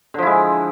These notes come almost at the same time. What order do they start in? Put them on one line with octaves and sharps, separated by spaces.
D3 F3 E4 G#3